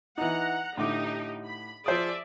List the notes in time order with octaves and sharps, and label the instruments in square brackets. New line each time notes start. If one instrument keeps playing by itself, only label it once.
[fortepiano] E3 D#4 [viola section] F#5 A#5
[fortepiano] A2 D3 D6 [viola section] D#4 G4
[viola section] B5
[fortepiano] F3 C5 D#6 [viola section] G#4 D5 E5